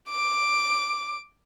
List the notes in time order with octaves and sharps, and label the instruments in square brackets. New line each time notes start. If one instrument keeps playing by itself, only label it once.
[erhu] D6 [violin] D7